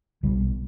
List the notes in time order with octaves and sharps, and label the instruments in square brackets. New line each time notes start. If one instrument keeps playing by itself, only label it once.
[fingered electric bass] B1 B2 G3